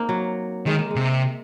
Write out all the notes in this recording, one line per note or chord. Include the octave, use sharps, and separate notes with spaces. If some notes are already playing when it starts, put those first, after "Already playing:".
Already playing: A#3 C4 D#4
F#3
D#3 G#3
A#3
G#3
C3